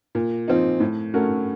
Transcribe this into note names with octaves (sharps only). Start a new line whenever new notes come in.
A#2
F3 C4 D#4
A2
A3 C#4 F#4 A#4